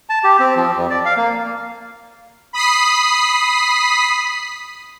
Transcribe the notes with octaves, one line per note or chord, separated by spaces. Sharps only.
A5
G4
C4
F3
F2
D5
F5
A#3
B5 D#6 B6 C7